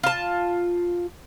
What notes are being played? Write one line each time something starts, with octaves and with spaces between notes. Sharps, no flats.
F4 A5